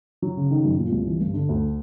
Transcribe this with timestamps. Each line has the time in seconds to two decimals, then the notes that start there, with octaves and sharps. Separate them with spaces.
0.22 F#3
0.37 C#3
0.51 D#3
0.65 F#2
0.78 A#2
0.92 C2
1.07 E3
1.21 G2
1.34 D3
1.49 D2